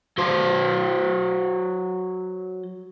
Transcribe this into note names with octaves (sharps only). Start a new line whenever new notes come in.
F#3 C5